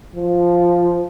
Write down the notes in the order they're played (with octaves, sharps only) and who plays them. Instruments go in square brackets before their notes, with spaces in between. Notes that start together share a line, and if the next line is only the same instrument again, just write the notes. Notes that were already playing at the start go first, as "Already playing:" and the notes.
[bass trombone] F3